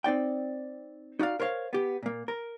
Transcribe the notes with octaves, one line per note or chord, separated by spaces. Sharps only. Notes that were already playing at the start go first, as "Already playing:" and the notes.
C4 D#4 D5 G5
D#4 F#4 D5 F5
A#4 C5 C#5 F5
B3 G4
A#2 A#3
A#4